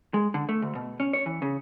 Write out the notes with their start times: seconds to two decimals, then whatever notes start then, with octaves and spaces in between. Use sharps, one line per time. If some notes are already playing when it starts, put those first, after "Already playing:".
0.14 G#3
0.34 D3
0.49 A3
0.62 D2
0.75 B2
1.00 C#4
1.13 C#5
1.26 E3
1.42 C#3